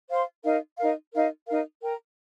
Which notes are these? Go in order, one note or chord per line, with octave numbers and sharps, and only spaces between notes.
C5 F5 C6
D#4 A#4 F5
D#4 A#4 F5
D#4 A#4 F5
D#4 A#4 F5
A#4 G5 A#5